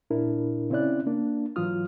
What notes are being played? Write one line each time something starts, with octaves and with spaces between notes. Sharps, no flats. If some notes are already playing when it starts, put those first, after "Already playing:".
A#2 D4 E4 A#4
C#3 C4 C#4 E4 D5 F#6
A#3 D4
G#2 E3 F#3 F4 D#6 F6